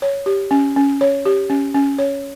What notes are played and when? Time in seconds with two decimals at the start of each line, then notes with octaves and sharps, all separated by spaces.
0.02 C#5
0.26 G4
0.51 C#4
0.76 C#4
1.01 C#5
1.26 G4
1.50 C#4
1.74 C#4
1.99 C#5